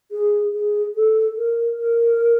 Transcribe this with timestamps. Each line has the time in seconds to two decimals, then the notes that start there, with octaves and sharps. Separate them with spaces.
0.11 G#4
0.53 G#4
0.96 A4
1.37 A#4
1.78 A#4